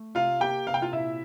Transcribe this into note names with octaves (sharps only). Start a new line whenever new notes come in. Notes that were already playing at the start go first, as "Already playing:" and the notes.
Already playing: A3
C3 F4 F5
A#3 G4 G5
C3 F5
G5
F4 F5
A#2 E4 E5